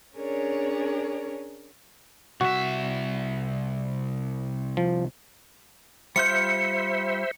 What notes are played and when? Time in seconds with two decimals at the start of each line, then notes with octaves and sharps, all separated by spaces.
0.15 C#4 D4 G#4 A#4 C#5 D5
2.41 C2 F#4 E5
4.77 F3
6.16 G3 F4 C5 E5 G6 C#7